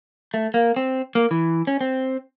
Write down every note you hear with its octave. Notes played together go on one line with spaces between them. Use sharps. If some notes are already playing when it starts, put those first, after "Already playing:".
A3
A#3
C4
A#3
E3
C#4
C4